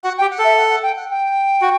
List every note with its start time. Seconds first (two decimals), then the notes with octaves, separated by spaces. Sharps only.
0.03 F#4 F#5
0.17 G4 G5
0.30 F#5
0.39 A4 E5
0.57 F#5
0.69 F#5
0.82 G5
0.96 F#5
1.09 G5
1.62 F#4